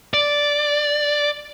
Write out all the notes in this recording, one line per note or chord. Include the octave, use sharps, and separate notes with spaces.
D5